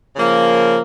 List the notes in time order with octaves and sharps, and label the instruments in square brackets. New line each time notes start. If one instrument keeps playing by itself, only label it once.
[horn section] C#3 F3 A#3